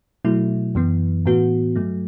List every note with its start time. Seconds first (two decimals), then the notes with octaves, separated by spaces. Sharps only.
0.25 B2 F#3 A3 E4
0.75 F#2 E3 B3
1.26 A2 E3 B3 F#4
1.76 G2 F#3 A3